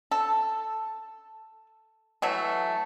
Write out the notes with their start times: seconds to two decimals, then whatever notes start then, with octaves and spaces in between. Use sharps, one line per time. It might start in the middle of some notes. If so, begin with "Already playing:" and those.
0.11 A4
2.22 E3 F#3 A3